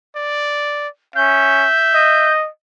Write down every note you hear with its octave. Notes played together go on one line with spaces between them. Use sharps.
D5
C#4 E5 G6
D#5